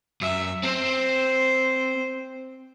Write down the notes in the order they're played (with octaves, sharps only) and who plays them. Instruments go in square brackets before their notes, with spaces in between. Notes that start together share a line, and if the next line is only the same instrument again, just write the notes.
[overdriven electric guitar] F#2 [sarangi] E5
[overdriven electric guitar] C4 [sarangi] C5